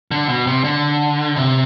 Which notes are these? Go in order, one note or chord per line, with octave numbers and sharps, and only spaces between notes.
D3
B2
C3
D3
C3